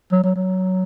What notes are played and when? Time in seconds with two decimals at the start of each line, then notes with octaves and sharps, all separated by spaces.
0.12 F#3
0.24 F#3
0.36 F#3